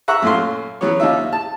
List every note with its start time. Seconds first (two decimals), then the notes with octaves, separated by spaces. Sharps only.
0.08 E5 F#5 A#5 C#6
0.22 F#2 A#2 A3 F4 C6
0.81 E3 F#3 B3 C#4 C#5
1.00 D#2 D#4 F4 E5
1.33 A5